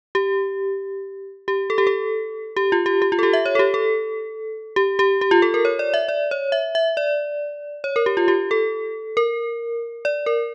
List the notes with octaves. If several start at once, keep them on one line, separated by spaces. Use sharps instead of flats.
G4
G4
A4
G4
A4
G4
F4
G4
G4
F4
A4
G4
E5
C#5
A4
G4
A4
G4
G4
G4
F4
A4
A#4
C#5
D5
E5
D5
C#5
E5
E5
D5
C#5
A#4
G4
F4
G4
A4
A#4
D5
A#4